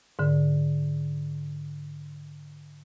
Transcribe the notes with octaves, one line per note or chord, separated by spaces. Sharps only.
G#2 D3